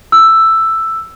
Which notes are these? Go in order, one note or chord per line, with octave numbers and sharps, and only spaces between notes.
E6